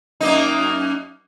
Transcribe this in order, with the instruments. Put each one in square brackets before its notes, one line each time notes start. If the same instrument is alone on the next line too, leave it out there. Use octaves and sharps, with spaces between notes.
[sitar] F#2 A#3 D#4